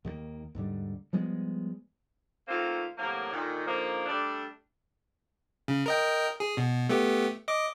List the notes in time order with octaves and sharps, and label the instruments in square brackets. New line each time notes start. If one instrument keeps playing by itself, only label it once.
[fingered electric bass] D#2 D#3 G#3 A#3
D#2 G#2 D3 G3
F3 G3 G#3 B3
[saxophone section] D#3 A3 A#3 C4 F4
A2 C3 F#3 A#3
A#2 D3 D#3
D3 D#3 F3 A#3
G3 A3 D4
[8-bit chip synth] C#3
A#4 D#5 G5
G#4
B2
A3 B3 G4
D#5 D6